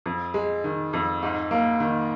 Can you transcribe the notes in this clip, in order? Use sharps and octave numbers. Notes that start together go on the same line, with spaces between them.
F2
G#3
D#3
F2
G#2
A#3
D#3